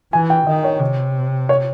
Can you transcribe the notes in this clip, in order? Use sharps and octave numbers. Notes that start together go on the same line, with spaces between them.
E3 G#5
G5
D#3 D#5
C#5
C3
C#5